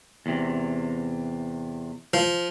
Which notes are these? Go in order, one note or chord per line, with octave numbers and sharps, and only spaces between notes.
E2 C3
F3